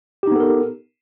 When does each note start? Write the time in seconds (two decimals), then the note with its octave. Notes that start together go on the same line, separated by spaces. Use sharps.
0.23 G4
0.27 D#4
0.32 B3
0.36 A4
0.40 A#4